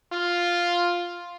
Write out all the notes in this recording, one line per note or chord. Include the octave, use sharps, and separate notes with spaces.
F4